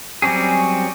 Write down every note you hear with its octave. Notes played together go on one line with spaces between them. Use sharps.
F#3 G3 C4 C#4 G#4